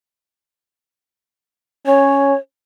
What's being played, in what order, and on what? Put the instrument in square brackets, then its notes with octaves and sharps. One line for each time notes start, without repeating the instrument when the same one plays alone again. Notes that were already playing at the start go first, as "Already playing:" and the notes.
[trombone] C#4 [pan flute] C#5